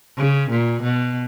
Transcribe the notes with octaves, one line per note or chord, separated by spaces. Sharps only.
C#3
A#2
B2